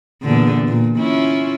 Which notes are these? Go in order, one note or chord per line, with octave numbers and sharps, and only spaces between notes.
E2 A#2 D3
A#2
C#4 E4 F4